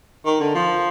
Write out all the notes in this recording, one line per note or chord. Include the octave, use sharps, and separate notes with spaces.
D#3
D3
F3